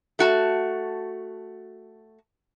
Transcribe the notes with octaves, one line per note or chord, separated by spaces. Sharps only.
A3 F#4 A5